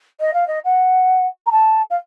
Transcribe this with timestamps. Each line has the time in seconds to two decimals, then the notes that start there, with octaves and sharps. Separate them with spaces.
0.20 D#5
0.34 F5
0.47 D#5
0.65 F#5
1.46 A#5
1.51 A5
1.90 F5